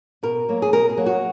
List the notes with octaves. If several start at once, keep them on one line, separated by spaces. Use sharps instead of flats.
B2 A#4
F#3 A#3
G#4
B2 A#4
G#4
F#3 A#3
F#4